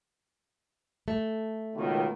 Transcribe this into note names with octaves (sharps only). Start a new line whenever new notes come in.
A3
C#2 B2 D#3